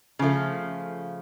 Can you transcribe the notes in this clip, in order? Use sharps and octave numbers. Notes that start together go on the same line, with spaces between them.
C#3 F3 A3